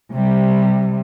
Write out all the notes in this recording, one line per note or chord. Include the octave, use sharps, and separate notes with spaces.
C3 G3